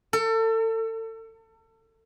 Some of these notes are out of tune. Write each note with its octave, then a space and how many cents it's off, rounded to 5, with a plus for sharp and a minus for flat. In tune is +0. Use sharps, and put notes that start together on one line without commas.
A4 +30